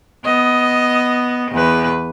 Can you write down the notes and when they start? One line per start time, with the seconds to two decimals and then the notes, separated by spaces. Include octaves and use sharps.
0.25 B3 D#5
1.51 E2 B4